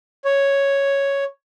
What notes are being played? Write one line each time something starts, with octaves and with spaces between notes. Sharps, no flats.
C#5